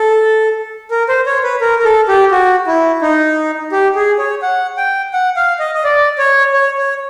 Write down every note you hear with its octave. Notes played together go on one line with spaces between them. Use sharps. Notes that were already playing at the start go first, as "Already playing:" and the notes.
Already playing: A4
A#4
C5
C#5
B4
A#4
A#4
A4
G4
F#4
E4
D#4
G4
G#4
C#5
F#5
G5
F#5
F5
D#5
D#5
D5
C#5
C#5
C#5